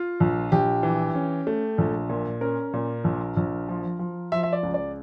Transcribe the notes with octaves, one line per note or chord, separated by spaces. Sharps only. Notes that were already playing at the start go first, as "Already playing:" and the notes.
Already playing: F4
A#1
A#1 G4
E3
C#4
A3
A#1
A#2
C#4 A#4
A#2
A#1
A#1
F3
F3
F3 E5
E5
D5
C#2
D5